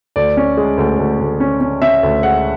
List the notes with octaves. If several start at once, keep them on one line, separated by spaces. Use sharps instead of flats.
D2 D5
C#4
G#3
D2
D2
D2
C#4
C#4
C#4 E5
D2
G#3 F#5